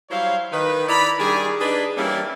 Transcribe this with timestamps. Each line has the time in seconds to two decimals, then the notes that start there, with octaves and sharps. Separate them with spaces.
0.10 F#3 G3 E4 C5 C#5 F5
0.52 D#3 B4
0.88 E4 D5 A#5 B5
1.19 D#3 G3 D4 G#4
1.60 D4 D#4 G#4 B4 D5
1.97 E3 G3 A#3 C#4 D4 E4